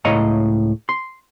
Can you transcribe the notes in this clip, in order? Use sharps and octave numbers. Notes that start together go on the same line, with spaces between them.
C#2 A2 C#5 D#5 F5 A#5
C6